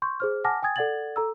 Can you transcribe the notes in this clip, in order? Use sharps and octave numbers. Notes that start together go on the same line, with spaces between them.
C6 C#6 G6
G#4 C5 F6
F#5 G#5 A5 D6 F6 A#6
G5 G#5 D#6 G#6 A6
A4 D5 F#5 G#6 A6 F#7
A4 A#5 E6